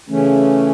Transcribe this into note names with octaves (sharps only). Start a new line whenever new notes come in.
C#3 E3 A3 C#4